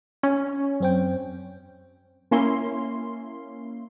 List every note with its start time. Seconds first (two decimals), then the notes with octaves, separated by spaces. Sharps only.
0.23 C#4
0.80 F#2 C4 G5
2.31 A#3 C#4 E4 C6